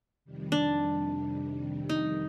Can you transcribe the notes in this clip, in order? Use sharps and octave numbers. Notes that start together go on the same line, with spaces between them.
F2 C3 D#3 G3
D4
D#4